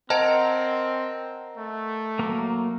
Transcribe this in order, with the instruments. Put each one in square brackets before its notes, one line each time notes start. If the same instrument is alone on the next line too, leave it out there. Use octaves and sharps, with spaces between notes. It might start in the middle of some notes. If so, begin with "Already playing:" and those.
[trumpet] C4 [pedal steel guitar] A#4 F#5 A#5 [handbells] C5 D#5 A5
[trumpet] A3
[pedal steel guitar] F#3 A#3